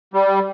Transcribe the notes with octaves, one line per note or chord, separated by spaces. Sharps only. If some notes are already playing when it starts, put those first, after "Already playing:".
G3